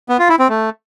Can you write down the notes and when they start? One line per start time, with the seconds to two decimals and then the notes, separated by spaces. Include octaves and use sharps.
0.09 B3
0.19 F4
0.29 E4
0.39 C4
0.49 A3